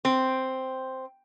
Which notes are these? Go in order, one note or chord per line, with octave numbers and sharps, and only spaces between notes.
C4